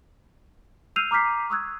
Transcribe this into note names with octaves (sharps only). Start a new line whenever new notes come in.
E6 F6 G6 C7 D#7 F7
A#5 D6 F6 G6 B6 C7
C#6 D#6 E6 F#6 G#6